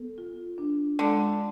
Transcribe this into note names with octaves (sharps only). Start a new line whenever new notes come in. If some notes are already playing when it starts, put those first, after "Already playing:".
Already playing: B3 A4
F4
D4
D3 G#3